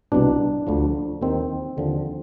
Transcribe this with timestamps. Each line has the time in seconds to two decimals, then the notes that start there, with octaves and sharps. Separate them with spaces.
0.12 C2 B2 D4
0.67 D2 D3 F3
1.22 D#2 D#3 C4
1.77 D#2 D3 F3